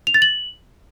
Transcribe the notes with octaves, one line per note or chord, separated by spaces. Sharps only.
F7
A6
F#7